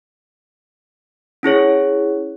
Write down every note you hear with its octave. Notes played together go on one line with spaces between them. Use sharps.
C#4 E4 G#4 C#5